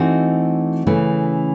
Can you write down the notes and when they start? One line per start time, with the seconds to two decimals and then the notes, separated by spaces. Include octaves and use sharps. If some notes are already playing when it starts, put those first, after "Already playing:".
Already playing: E3 A3 C4 D#4 F#4
0.87 C#3 E3 A3